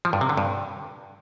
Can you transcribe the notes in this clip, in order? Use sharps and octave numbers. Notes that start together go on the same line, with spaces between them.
F3
G2
C3
D3
G2